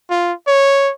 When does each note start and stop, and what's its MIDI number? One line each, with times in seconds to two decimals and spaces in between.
0.10 0.33 65
0.48 0.92 73